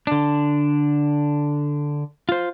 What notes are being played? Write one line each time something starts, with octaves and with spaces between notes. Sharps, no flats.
D3 D4
F4 C5